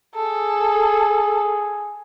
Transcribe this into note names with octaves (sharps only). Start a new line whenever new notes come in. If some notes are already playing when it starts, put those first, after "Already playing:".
G#4 A4